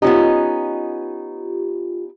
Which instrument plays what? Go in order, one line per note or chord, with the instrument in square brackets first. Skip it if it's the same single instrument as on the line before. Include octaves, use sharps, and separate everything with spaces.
[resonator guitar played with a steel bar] B3 C#4 D#4 [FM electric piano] F4 G4